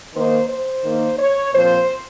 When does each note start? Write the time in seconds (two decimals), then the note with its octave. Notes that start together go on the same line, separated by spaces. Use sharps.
0.13 D#3 A#3 D#4 C5
0.48 C5
0.83 D#3 A#3 D#4
1.18 C#5
1.53 A#2 F3 C4 C5